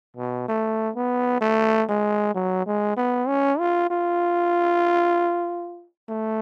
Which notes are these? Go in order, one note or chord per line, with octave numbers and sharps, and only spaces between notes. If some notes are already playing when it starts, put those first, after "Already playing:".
B2
A3
B3
A3
G#3
F#3
G#3
B3
C#4
F4
F4
A3